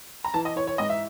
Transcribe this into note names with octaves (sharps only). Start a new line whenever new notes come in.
A#5
E3 A5
D#5
E3 C#5
C#5
G#2 D#5
E5